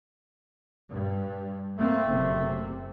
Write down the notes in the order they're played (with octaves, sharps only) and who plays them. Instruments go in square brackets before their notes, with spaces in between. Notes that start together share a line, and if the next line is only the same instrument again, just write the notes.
[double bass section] G2
[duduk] A3 [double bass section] A#3 C4
[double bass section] F#1 C3